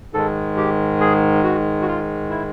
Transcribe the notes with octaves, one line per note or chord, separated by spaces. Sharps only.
G#2 D#3 G#3 A4
G4
G#4
F#4
F#4
F4
E4